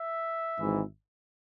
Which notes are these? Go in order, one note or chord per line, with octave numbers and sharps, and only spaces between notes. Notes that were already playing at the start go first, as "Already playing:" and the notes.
Already playing: E5
G#1 G#2 E3